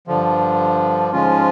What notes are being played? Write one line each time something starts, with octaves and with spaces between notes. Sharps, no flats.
G2 D3 F3
G#2 F3 G#3 C#4 F4